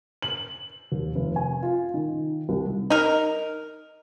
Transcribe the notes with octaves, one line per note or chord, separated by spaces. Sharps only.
F#7
D#2
F1
G#5
F4
D#3
C2
D#4 A#4